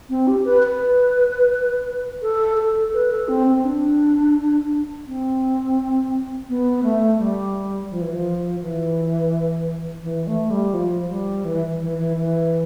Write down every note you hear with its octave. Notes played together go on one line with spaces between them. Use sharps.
C4
G4
B4
B4
A4
A4
B4
A4
C4
C4
D4
C4
B3
A3
G3
F3
E3
F3
E3
E3
A3
G3
F3
G3
E3
E3
E3
E3